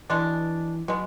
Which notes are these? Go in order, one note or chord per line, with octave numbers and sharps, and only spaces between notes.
B2 E3 G#3 D4
B2 F#3 G#3